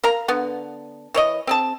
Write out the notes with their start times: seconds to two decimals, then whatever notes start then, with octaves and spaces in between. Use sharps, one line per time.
0.04 A#4 F5 A#5
0.28 D3 B3
1.14 E3 C#5 D#5
1.47 C4 G#4 A5